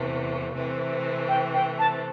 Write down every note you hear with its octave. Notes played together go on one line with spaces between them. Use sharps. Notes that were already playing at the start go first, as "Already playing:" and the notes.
Already playing: E2 C3 E3 A3
C3 E3 A3 C4
G5
G5
A5